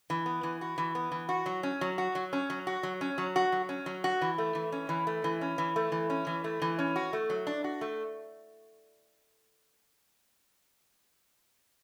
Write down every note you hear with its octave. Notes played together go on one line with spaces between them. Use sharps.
E3
B3
E3
F#4
E3
B3
E3
F#4
F#3
C#4
F#3
F#4
F#3
C#4
F#3
F#4
F#3
C#4
F#3
F#4
F#3
C#4
F#3
F#4
E3
A3
E3
C#4
E3
A3
E3
C#4
E3
A3
E3
C#4
E3
A3
E3
C#4
F#4
A3
F#3
D4
F#4
A3